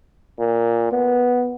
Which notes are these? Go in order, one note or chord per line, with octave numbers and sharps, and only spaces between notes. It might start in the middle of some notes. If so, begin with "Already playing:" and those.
A#2
B3